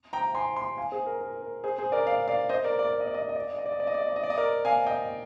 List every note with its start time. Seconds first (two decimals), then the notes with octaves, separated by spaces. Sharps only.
0.13 G5 A#5
0.35 G#5 C6
0.56 G#5 C6
0.78 F5 G#5
0.92 G#4 C5
1.06 A#4
1.21 A#4
1.42 A#4
1.64 G#4 C5
1.78 G#4 C5
1.92 A#4 D5
2.07 D5 F5
2.28 D5 F5
2.49 C5 D#5
2.64 A#4 D5
2.79 A#4 D5
2.93 D5
3.00 D#5
3.07 D5
3.14 D#5
3.22 D5
3.29 D#5
3.36 D5
3.43 D#5
3.51 D5
3.58 D#5
3.66 D5
3.72 D#5
3.80 D5
3.87 D#5
3.94 D5
4.01 D#5
4.09 D5
4.16 D#5
4.23 D5
4.30 D#5
4.38 A#4 D5
4.65 F5 G#5
4.87 D#5 G5